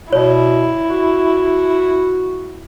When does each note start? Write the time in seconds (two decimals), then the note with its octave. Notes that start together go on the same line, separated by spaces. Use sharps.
0.13 B2 E4 C#5 D5
0.90 F#4